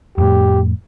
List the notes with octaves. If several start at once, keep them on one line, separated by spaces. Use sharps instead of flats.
F2 A2 G4